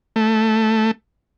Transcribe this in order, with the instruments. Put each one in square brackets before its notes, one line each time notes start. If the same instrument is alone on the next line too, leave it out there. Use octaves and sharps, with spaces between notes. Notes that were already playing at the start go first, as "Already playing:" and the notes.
[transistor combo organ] A3